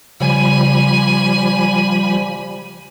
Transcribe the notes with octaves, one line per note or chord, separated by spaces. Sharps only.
C#3 F3 G3 G#5 B5